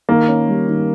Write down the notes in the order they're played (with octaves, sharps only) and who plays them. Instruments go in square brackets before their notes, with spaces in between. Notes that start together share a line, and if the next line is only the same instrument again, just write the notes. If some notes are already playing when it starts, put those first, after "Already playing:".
[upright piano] D#3 [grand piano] A#3
[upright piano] C#4
G3
D#3